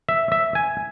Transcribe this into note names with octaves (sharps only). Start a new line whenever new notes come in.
E5
E5
G#5